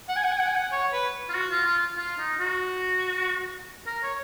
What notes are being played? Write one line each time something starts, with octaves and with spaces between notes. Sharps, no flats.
F#5
G#5
F#5
G#5
F#5
G#5
F#5
C#5
B4
F4
F#4
F4
F4
F4
D#4
F#4
A#4
C#5